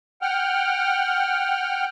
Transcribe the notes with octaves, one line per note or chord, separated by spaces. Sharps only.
F#5 G5 F6